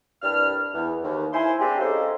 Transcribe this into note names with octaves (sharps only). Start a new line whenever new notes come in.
C2 G2 G3 D4 F6
E2
D#2
E4 C5 G#5 C6
C4 D4 G4 G#4
G#3 C#4 D#4 F4 A4 C5